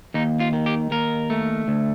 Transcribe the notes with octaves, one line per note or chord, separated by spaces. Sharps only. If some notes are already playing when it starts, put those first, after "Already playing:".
D#2 D#4
F4
D#3
G4
D#2 A#4
A3
D2